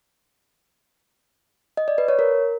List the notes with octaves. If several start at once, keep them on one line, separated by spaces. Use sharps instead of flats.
D#5
D5
B4
C#5
A#4